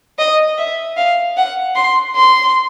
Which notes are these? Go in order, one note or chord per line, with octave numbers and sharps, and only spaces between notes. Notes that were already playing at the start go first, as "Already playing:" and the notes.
D#5
E5
F5
F#5
C6
C6